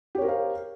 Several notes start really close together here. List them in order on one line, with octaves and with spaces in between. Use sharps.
G4 C#5 A#4 C5 F5